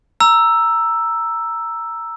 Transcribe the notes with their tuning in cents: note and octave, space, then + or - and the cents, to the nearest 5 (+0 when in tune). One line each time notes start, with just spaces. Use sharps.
A#5 +0 E6 +5